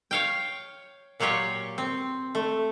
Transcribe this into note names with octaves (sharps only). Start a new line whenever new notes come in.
C#5 F5 G5
A#2 F#3 F4 G4 C#5
C4
A3